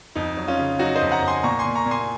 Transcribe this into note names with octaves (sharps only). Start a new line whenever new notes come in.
F2 D#4
F#3
C#4 F4
C#3
F#3 D#4 F#4
C5 D#5
F2
F#5 A#5
F2
G#5 C6
A#2 A#5 C#6
G#5 C6
A#2
A#5 C#6
A#2
G#5 C6